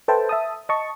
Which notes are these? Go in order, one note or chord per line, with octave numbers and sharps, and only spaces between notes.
A4 B4 C5 E5 G5 A5
E5 A5 D#6
D#5 A5 C#6